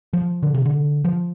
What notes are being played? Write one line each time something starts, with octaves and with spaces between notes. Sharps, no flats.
F3
D3
C3
D3
F3